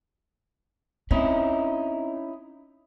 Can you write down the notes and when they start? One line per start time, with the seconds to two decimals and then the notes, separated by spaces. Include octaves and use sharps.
1.11 C4 C#4 D#4 E4